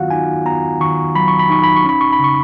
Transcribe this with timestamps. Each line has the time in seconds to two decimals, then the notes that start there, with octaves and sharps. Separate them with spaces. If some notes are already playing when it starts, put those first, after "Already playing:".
Already playing: D#3 F#3 B3 F4 F#4 F5 F#5
0.11 D#4 G#5
0.45 B3 A#5
0.80 D#3 C#6
1.15 F#3 B5
1.28 C#6
1.39 B5
1.50 D#4 C#6
1.63 B5
1.76 C#6
1.85 C#4 B5
2.01 C#6
2.13 B5
2.20 C#3 C#6